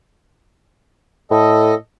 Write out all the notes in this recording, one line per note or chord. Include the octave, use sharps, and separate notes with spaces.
A2 A4 D#5